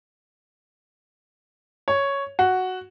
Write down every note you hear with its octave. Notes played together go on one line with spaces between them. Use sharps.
C#5
F#4